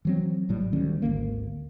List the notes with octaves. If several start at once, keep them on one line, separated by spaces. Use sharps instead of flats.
E3 F#3 C4
G#1 A2 F#3 G3
D2 D#3 G3 C#4
G#1 D2 A#3